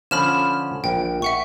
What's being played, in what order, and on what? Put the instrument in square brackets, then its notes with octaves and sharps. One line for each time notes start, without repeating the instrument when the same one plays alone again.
[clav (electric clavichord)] D3 F3 C#4 [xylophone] B5 F6 E7
[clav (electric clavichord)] A#1 [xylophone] G5
[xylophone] E5 F#5 C#6